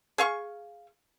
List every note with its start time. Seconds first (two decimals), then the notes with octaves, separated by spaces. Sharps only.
0.18 G#4 F5 C#6